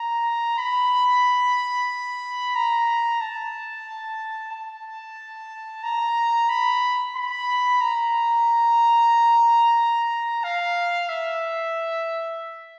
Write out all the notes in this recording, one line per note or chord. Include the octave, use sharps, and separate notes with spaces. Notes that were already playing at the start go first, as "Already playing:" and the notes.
Already playing: A#5
B5
A#5
A5
A5
A#5
B5
B5
A#5
F5
E5